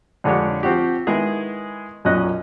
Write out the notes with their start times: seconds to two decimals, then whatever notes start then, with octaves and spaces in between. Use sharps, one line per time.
0.24 F2 D3 G#3 D4 G4 C#5
0.63 F3 C4 F#4 G4
1.07 D#3 G#3 B3 E4 G#4
2.05 B1 F#2 A#2 C#4 D#5 F#6